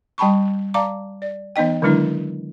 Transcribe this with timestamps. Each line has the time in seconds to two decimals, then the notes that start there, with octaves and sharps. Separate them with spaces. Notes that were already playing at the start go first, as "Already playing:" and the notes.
0.18 G3 G5 A5 B5 C#6
0.74 D5 F5 A5 A#5 D6
1.22 D5
1.56 E3 B3 D#4 D#5 G5
1.82 D3 D#3 F#3 G#3 D4 E4